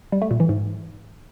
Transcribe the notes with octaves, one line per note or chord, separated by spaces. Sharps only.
G3
A3
A#2
E3
G#2